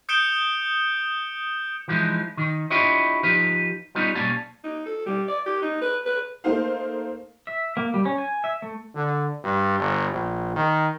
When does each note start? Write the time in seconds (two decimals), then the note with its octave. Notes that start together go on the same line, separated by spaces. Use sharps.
0.09 D#6 G6 C#7 D7 E7 G7
1.88 E3 F3 G#3 D#4
2.37 D#3
2.70 D4 E4 F4 G4 C#5 D#5
3.23 F3 D#4 F4 G4 B4
3.95 G3 B3 C#4 D#4 F4
4.15 B1 G3 A#3 C#4 F5 A5
4.64 D#4
4.86 A4
5.06 G3
5.28 D5
5.46 G4
5.62 D#4
5.81 B4
6.06 B4
6.44 A3 A#3 D#4 C5 F5
7.47 E5
7.77 A#3
7.94 G3
8.05 C#4
8.18 G#5
8.44 E5
8.62 A3
8.94 D3
9.44 G2
9.80 G1
10.12 A#1
10.56 D#3